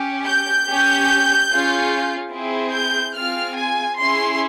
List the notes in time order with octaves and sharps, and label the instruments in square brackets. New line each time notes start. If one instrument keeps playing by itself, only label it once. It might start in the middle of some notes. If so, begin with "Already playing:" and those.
Already playing: [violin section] C#4 G4
G6
C#4 G4
C#4 F4 G#4
C4 E4 G#4
G6
C4 F4 G#4 F6
G#5
C#4 E4 G#4 C6